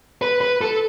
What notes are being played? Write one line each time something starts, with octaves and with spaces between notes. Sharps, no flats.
B4
B4
A4